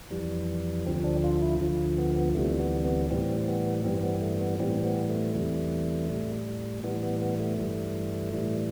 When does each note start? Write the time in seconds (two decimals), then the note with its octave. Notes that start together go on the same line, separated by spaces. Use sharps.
0.11 F2 E3 G3
0.86 D2 D3 F3 C4
1.04 D4
1.24 F4
1.42 E4
1.60 D2 D3 F3
1.98 B3
2.16 B3
2.35 D2 C3 E3 G3 A3
2.60 B3
2.85 B3
3.10 A2 E3 G3 C4
3.48 B3
3.84 G2 E3 G3 C4
4.03 B3
4.22 A3
4.41 B3
4.60 A2 E3 G3 C4
4.85 B3
5.09 A3
5.35 E2 C3 E3 G3
6.09 A2 G3
6.83 A2 E3 G3 B3
7.03 B3
7.22 B3
7.39 A3
7.58 G2 E3 G3
8.33 A2 E3 G3